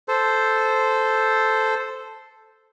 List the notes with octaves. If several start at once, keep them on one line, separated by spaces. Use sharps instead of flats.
A4 C5